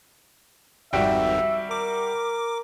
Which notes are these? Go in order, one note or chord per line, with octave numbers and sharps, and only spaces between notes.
G#1 F2 G#2 G3 F#4 E5 G5
A#4 D6